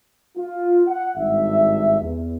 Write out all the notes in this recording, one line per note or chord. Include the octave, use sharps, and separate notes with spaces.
F4
F#5
G#1 G2 E5
E2